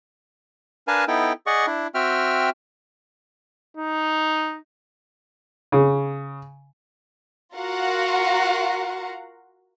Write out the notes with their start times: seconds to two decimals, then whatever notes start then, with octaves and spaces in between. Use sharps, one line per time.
0.88 D4 A#4 B4 F5 G#5 A5
1.08 B3 D#4 E4 A4 G5
1.46 G#4 D5 D#5 F#5 C#6
1.67 D4 E4
1.95 C4 F#4 E5 G5 F6
3.77 D#4
5.72 C#3
7.55 F4 F#4 A#4 F5 F#5 A#5